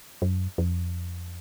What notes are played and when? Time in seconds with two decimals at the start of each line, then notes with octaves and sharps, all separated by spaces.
0.22 F#2
0.58 F2